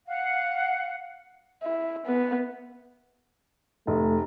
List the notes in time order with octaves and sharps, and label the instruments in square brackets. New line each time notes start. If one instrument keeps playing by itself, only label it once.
[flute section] F5 F#5
[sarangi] E4
B3
[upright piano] F1 [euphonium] A3